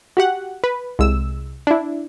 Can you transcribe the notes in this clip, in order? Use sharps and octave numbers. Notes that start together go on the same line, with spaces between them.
F#4 G4 F#5
B4
C2 G#3 E6
D4 E4